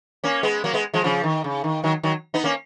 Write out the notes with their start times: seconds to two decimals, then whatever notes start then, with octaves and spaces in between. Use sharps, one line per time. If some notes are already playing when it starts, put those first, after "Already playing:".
0.24 A#3 C#4
0.43 G#3 B3
0.64 F#3 A#3
0.73 G#3 B3
0.93 F3 G#3
1.04 C#3 F3
1.23 D#3
1.44 C#3
1.64 D#3
1.84 D#3 F#3
2.03 D#3 F#3
2.34 B3 D#4
2.44 A#3 C#4